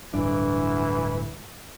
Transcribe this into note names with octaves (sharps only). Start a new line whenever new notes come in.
D1 G2 E3 D4